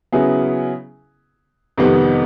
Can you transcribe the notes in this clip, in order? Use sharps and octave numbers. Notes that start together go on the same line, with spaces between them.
C#3 F#3 B3 E4 G#4
F2 C3 D#3 G3 B3